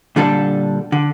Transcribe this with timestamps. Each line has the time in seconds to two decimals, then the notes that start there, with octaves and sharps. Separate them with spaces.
0.16 A#2 D3 G3 D4 A4
0.92 D3